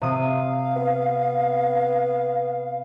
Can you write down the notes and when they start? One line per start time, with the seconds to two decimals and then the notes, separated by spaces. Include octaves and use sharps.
0.02 C3 F5 D#6
0.76 B3